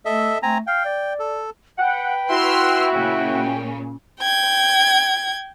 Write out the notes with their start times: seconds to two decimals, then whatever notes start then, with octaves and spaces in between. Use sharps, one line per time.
0.05 A3 A4 D#5 E5
0.43 A3 C4 G#5 A#5
0.67 F5 G5
0.85 D5
1.19 A4
1.78 B4 F#5 G5
2.30 E4 F#4 C6 E6 F6
2.93 A#2 C#3 G5
4.20 G5 G#6